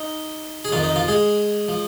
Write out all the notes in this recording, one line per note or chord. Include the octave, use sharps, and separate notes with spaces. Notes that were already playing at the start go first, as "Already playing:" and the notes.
Already playing: D#4
G#4
F2 D#3 F3 F4
D#3 D#4
F3 F4
G#3 G#4
F3